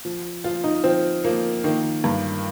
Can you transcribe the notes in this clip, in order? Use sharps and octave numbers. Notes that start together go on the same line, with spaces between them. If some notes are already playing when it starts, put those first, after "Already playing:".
F3
F3 F4
D#4
F3 C4
F3 A#3
D#3 A#3
G2